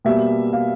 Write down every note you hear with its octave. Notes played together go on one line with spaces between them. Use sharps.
B2 G3 A#3 E5
F5